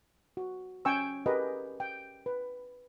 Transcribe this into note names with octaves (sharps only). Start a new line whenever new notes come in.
F#4
C#4 G5 G#5 C#6 E6
G4 G#4 A#4 B4 D#5
G5
B4